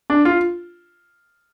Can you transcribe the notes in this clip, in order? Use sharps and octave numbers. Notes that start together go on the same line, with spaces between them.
D4
F4